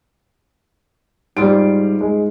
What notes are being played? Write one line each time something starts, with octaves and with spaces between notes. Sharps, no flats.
G#2 G3 F4 D7
G#3